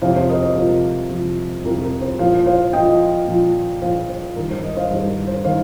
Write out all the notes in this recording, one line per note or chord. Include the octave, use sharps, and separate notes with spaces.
F2 C3 F3 C5 F5
C5
A#4 D#5
C5
F2 C3 F3
F2 C3 F3
F2 C3 F3 A#4
A#4
C5
A#2 F3 C5 F5
C5 F5
A#2 F3 D#5 G5
A#2 F3
A#2 F3 C5 F5
C5
G2 D#3 A#4
C5
A#4 D#5
C5 F5
G2 D#3 C5
A#4
C5
D#3 C5 F5